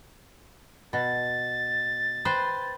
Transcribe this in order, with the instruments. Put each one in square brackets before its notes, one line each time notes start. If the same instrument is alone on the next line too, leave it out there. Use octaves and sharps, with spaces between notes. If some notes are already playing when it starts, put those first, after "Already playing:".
[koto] B2 [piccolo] A6
[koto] B4 C5 G5